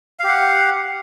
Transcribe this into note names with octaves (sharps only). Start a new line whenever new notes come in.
G4 F5 F#5